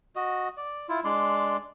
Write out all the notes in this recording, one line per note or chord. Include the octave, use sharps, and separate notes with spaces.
F#4 D#5
D5
E4 F4
G#3 D4 D5 C6